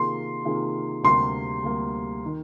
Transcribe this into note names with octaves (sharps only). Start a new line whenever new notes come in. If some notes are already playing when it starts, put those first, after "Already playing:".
Already playing: C3 D#3 A#3 F4 G#4 C6
C3 D#3 A#3 F4 G#4
D2 C3 G3 A#3 C6
D2 C3 G3 A#3
D#3